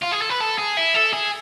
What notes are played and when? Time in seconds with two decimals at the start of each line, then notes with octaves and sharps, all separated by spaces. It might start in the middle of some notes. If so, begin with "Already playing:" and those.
0.03 F4
0.13 G#4
0.22 A4
0.30 B4
0.41 A4
0.58 G#4
0.77 E4
0.95 A4
1.13 G#4